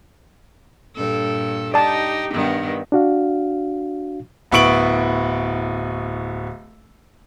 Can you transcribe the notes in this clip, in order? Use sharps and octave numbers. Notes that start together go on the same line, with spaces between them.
G2 A#2 A4
D#4 G4 D5 A5
G2 D#3 B3
D4 F#4 F5
D1 B3 E4 C#6 D7 F#7